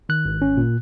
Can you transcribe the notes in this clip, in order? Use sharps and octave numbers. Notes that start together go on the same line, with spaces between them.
D#3 F#6
G#1
C#4
A#2